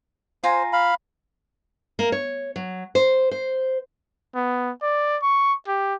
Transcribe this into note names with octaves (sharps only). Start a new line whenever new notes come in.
F4 C5 G#5 A#5
F5 B5
A#3
C#5
F#3
C5
C5
B3
D5
C#6
G4